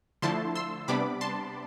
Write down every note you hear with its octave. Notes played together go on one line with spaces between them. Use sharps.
D3 F3 A3 E4 A5 C6
C6 E6
C3 G3 B3 D4 B5 D6
A5 C6